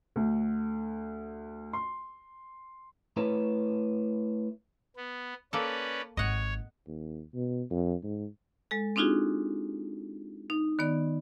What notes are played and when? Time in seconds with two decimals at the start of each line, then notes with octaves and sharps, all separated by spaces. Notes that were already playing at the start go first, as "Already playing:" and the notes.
0.16 D2
1.73 C6
3.17 A3 E4 B4 C#5 A#5
4.96 B3
5.53 A#3 C#4 A4 B4 D5
6.17 G#1 C#5 D#5 F#5
6.87 D#2
7.34 B2
7.71 F2
8.03 G#2
8.71 G#3 A4
8.96 C4 D4 D#4 F4 F#4 G#4
10.50 D#4
10.79 D#3 B3 D5